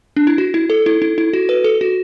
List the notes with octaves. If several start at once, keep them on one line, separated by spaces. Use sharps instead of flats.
D4
E4
F#4
E4
A4
E4
E4
E4
F#4
B4
A4
F#4